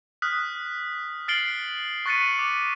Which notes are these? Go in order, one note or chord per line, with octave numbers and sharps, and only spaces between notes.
D#6 F6 F#6 B6
F6 A6 C7 D7 F#7 G7
C#6 F#6 A6 B6 C#7 D#7
D6